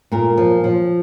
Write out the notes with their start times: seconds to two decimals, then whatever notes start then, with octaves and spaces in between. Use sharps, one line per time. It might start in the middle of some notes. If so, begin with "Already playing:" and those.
0.12 A#2 A#4
0.38 F3
0.64 F3